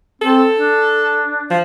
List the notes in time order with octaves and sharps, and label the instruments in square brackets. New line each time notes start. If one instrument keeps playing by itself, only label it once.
[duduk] C4 [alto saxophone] A4
[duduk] D4
[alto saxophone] F3